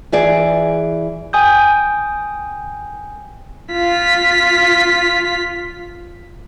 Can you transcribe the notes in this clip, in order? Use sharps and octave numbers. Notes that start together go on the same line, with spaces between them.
E3 G#4 D5
G5 G#5 D#6 G6
F4 B6